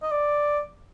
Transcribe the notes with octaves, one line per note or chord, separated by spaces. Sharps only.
D#5
D5